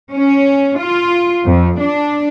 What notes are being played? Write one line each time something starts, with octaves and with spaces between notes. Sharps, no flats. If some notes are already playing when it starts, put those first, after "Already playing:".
C#4
F4
F2
D4